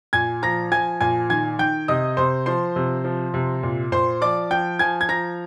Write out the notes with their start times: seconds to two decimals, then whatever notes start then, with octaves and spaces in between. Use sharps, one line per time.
0.13 A#2 G#5 G#6
0.43 F3 A#5 A#6
0.71 F3 G#5 G#6
1.00 A#2 G#5 G#6
1.30 D#3 G#5 G#6
1.59 D#3 G5 G6
1.88 C3 D#5 D#6
2.17 C3 C5 C6
2.46 F3 C5 C6
2.76 C3
3.04 F3
3.34 C3
3.63 A#2
3.92 A#2 C5 C6
4.21 F3 D5 D6
4.51 F3 G5 G6
4.79 F3 G#5 G#6
5.01 G#6
5.09 F3 A#5 A#6